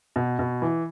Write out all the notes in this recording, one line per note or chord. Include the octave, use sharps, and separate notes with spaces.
B2
B2
E3